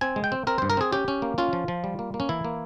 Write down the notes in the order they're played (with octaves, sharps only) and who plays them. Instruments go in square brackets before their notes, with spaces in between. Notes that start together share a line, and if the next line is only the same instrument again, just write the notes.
[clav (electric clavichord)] C4 G#5
G#3
G5
C4
C4 A#4
G2 C5
A#4
C4 G#4
C#4 G4
C#4
A#3
C#4 F4
F3
F3
G3
A#3
A#3
C#4
E3 E4
A#3